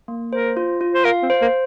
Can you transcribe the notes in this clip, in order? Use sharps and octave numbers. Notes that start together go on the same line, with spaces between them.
A#3
A#4 C5
F4
F4
C5
A#4 F5
C4
C5
A#3